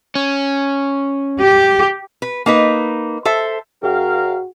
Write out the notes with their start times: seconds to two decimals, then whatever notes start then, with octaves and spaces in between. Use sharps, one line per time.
0.15 C#4
1.42 G4
2.22 B4
2.46 A#3 D#4 B4
3.25 A4 C5 E5
3.83 F#2 F#4 G#4 A#4 F5 G5